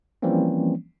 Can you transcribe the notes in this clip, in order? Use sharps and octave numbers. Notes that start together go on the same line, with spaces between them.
E3 F3 G3 A#3 C4 C#4